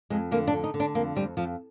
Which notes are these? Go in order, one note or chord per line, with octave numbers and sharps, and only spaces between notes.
F2 G#3
D3 A#3
D4
D3
D#4
D3
D4
F2 A#3
F2 G3
F2 F3